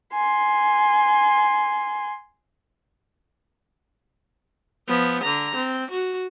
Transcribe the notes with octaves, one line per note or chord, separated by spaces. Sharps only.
G#5 C6
F3 B3
D3 A#5
C4
F#4